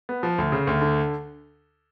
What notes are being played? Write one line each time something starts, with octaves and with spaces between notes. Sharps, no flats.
B3
F3
D2
C#3
D2
D3